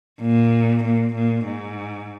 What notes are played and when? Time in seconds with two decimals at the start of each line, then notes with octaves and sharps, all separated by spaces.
0.21 A#2
0.84 A#2
1.15 A#2
1.45 G#2